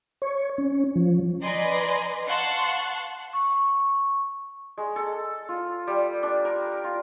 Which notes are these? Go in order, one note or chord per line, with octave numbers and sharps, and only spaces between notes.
C#5
C#4
F3
B4 D5 D#5 G#5 A#5 C6
F5 F#5 A5 C6 C#6 F#6
C#6
G#3
A4
F4
G3
D4
A#4
F4